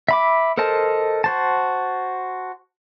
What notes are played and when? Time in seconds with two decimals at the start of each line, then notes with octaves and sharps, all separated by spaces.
0.08 E5 B5 D6
0.58 A4 A#4 C5 D#5 A5
1.24 F#4 C5 A5